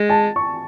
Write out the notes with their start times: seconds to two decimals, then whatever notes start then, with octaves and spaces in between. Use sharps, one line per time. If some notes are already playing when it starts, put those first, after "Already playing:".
Already playing: G#3
0.09 A5
0.36 C#6